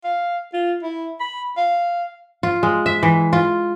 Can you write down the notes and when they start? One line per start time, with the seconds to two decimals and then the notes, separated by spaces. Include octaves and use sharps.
0.04 F5
0.53 F4
0.83 E4
1.20 B5
1.57 F5
2.43 F4
2.63 G#3
2.86 E5
3.03 E3
3.33 F4